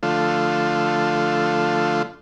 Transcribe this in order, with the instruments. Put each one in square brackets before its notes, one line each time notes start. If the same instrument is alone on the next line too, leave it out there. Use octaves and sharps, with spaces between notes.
[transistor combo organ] D3 F3 A3 F4